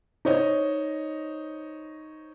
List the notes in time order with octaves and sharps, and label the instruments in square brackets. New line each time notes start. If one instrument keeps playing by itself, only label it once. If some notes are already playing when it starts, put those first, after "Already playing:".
[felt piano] D#4 C5 C#5 D#5